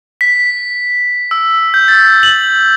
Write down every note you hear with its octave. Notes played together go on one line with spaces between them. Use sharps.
B6
E6
G6
A6
F#7